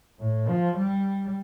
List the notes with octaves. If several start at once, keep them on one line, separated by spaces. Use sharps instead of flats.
A2
F3
G3